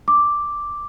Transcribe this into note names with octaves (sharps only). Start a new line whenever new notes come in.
D6